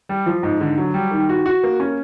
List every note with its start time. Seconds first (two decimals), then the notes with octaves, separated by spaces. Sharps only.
0.09 G3
0.26 F3
0.43 G#2
0.61 D3
0.78 F#3
0.94 G3
1.11 D#3
1.29 F#4
1.46 F#4
1.64 A#3
1.80 C#4